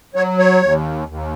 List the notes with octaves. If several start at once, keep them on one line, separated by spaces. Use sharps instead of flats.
F#3 C#5
C#5
D#2
D#2